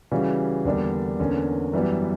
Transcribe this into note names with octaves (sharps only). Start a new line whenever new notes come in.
C#3 E3 G3 C#4 F#4
E2 D3 G3 A#3 D4
E2 D3 A#3 C#4
F#2 E3 G3 B3